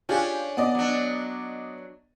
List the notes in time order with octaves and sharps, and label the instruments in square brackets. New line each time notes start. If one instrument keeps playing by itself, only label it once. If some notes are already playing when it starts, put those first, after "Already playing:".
[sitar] C#4 D4 [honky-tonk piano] F4 G4 G#4
[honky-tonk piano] B3 D5 D#5
[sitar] F#3 D4